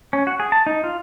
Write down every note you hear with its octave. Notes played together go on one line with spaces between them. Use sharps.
C#4
F#4
G#4
A5
D#4
F4